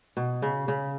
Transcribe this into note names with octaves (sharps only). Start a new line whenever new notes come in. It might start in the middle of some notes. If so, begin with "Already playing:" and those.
B2
C#3
C#3